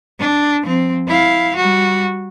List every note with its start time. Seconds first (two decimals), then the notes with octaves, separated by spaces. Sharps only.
0.20 D4
0.63 F3 C4
1.08 E4 F5
1.56 G3 F#4